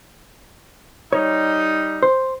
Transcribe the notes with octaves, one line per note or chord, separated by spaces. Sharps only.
G3 D#4 C#5
C5